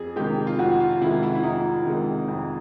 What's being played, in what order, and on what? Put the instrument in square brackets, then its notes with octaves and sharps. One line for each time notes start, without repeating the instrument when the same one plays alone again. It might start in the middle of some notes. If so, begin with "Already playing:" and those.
Already playing: [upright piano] F2 G#4
C3 D#3 G#3 G4
F4
F2 F#4
F4
C3 D#3 G#3 E4
E4
E4
F2 D#4
C3 D#3 G#3
F2